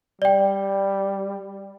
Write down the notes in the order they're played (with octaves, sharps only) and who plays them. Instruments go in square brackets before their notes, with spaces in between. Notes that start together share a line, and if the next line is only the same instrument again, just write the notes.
[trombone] G3 [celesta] D5 G5